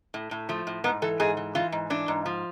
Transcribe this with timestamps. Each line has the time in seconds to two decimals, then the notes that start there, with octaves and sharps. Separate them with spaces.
0.14 A2
0.31 A2
0.49 F3 A3
0.67 A2
0.84 G#2 B3
1.02 E3 A4
1.20 G#2 G#4
1.37 E3
1.55 E3 F4
1.72 G#2
1.90 E3 D4
2.08 G#2
2.26 F3